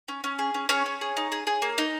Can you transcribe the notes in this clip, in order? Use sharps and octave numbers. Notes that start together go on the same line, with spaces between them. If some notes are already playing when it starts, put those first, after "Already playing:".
C#4
C#4
G#4
C#4
C#4 G#4 C#5
C#4
G#4
D#4
G#4
G#4
A#3
D#4